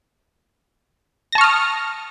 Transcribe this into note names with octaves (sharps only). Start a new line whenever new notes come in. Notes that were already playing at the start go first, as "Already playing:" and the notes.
A5 C#6 D#6 F6 A#6